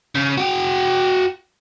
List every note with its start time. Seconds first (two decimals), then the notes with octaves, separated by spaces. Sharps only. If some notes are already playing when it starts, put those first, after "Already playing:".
0.15 C#3
0.38 F#4 G5